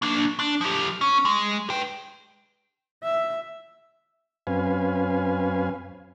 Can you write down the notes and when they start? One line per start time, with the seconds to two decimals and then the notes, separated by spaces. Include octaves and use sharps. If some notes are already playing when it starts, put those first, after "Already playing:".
0.02 A#3 D4
0.39 D4
0.61 F3 G4
1.01 C#4
1.25 G#3
1.70 B4 G5
3.03 E5
4.47 F#2 C4 C#4 B4 F5 G#5